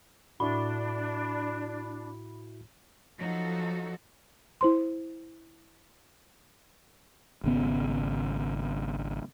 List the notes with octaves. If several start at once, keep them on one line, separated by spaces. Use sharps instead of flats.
A2 D4 E4 F#4 B5
F3 F#3 D#4 F#4 A4
E4 C5 C6
G#1 C#3 B3